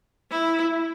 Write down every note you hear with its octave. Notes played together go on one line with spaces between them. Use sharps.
E4